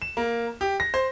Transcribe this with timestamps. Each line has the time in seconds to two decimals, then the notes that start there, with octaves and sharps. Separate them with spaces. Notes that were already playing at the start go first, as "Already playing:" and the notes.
0.02 E7
0.17 A#3
0.61 G4
0.80 A#6
0.94 C5